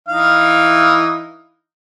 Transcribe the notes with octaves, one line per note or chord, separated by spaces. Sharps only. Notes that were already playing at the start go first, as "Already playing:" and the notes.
E3 D#4 F5